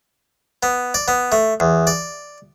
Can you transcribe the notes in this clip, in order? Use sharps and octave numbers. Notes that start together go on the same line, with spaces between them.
B3
D5
B3
A3
E2
D5